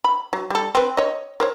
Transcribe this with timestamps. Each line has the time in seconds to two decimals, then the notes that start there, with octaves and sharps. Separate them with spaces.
0.04 B5
0.33 F#3
0.50 G3 A4
0.75 C4 B4
0.97 C#5 D#5
1.40 A#4 C5 C#5